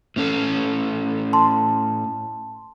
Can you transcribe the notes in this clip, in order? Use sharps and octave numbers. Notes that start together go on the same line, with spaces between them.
A2 C#4 A4
A5 C6